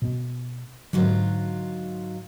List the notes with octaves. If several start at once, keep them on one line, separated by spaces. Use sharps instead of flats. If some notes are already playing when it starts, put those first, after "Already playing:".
B2 B3
G#2 D3 D#3 F#3 F4